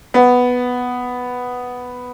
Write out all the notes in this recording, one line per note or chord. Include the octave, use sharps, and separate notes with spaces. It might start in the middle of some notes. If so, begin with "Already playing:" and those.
B3